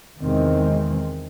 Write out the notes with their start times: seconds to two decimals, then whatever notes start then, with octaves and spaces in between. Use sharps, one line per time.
0.19 E2 C3 D#3 G#3 C4